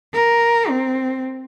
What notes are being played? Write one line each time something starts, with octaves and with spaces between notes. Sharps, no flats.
A#4
C4